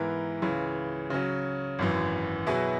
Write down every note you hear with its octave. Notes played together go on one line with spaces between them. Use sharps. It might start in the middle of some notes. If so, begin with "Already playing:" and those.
Already playing: G#2 E3 B3 E4 A#4
C#2 C#3 E3
C#3 F#3 C#4
G#1 F#2 E3
B2 F#3 B3 E4 G#4